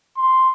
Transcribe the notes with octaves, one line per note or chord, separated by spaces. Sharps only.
C6